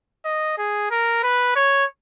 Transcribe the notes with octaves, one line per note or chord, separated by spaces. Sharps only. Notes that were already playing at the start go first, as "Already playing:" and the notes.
D#5
G#4
A#4
B4
C#5